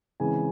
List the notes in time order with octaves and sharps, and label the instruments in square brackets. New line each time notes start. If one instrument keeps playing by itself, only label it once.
[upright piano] C#3 E3 G#3 C4 G#5